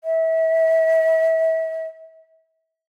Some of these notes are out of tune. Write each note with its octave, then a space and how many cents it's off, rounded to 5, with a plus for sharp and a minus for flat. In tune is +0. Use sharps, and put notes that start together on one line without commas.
E5 -30